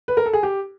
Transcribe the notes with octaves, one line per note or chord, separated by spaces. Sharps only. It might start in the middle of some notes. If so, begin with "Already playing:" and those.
B4
A#4
A4
G#4
G4